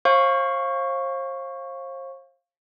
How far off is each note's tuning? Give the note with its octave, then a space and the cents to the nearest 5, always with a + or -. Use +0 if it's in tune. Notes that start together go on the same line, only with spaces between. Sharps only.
C5 +40 F5 +0 C#6 +0